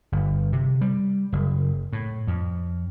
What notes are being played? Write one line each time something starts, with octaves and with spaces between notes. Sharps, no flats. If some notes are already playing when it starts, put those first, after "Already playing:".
G1
C3
G3
F#1
A2
F2